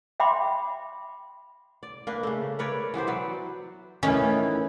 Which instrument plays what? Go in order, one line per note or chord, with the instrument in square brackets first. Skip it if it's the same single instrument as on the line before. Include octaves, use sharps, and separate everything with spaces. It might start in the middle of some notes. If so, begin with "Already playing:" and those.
[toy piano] E5 F#5 G5 B5 C6 D6
[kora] D5
A#3 D4 B4
C#3 A3
A#4 B4 C#5 D5
E3 B3 G4 C5
F#3 B4 D5
[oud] D#3 E3 A3 [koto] C#4